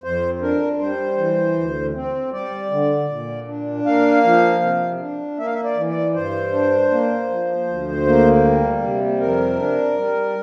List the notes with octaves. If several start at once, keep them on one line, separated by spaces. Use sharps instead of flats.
F2 C5
D4 A#4
G3 C5
E3
D2
C4
G3 D5
D3
A#2
D4
A#3 F5
F3
C3
D4
A#3 E5
F5
E5
D5
E3
D5
G2 C5
D4
A#3
F3
D2
A#3
G3
C3
F2 A#4
D4
G3